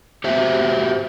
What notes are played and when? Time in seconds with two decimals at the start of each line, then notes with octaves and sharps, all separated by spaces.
0.24 F#4 G4 C5 E5